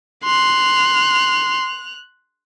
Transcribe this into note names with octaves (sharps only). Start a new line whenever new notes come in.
C6 F#6 F7